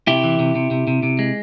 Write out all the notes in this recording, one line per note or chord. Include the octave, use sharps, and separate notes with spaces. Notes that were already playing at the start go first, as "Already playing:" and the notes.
C3 E4 G4
E3
C3
C3
C3
C3
C3
G#3